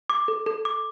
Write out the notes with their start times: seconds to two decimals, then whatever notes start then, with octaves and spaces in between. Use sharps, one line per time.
0.10 D6
0.28 A4
0.46 A4
0.65 D6